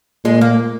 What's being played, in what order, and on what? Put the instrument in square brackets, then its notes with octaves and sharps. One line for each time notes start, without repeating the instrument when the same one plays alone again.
[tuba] A#2 [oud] G#3
[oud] A#3